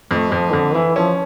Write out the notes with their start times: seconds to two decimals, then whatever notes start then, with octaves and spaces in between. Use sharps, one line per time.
0.11 F2 A3
0.32 F2 F3
0.53 F2 D3
0.74 E3 E4
0.95 F3 C#4